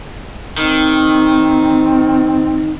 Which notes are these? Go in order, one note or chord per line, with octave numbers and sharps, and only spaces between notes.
D#3 C4